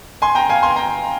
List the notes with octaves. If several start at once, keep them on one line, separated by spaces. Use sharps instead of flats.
G#5 C6
G5 A#5
F5 G#5
G#5 C6
G5 A#5